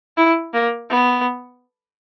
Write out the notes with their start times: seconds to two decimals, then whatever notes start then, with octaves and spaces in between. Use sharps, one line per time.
0.17 E4
0.53 A#3
0.90 B3